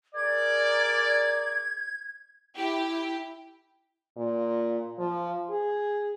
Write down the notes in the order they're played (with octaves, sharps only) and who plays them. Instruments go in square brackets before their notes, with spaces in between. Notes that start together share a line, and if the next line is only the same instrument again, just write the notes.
[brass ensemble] G#4 A#4 D5 [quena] G#6
[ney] E4 [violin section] G4
[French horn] A#2
F3
G#4